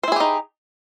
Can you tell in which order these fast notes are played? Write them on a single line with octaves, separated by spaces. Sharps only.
C5 E4 G#4 G4 D#4